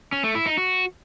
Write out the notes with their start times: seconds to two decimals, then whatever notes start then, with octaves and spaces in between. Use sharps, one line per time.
0.12 C#4
0.24 A3
0.35 E4
0.46 D#4
0.58 F#4